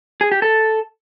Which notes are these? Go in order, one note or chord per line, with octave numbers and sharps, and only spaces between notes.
G#4
G4
A4